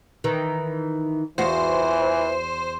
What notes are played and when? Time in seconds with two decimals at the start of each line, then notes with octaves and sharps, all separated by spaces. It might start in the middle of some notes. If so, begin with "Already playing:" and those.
0.24 D#3 E3
1.38 E2 E3 F4 F#4 C5